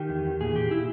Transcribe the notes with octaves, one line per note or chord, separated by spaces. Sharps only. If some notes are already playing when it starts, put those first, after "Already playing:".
Already playing: D#3 G4
E2
E2
A#2 G#4
A#2 G4
A#2 E4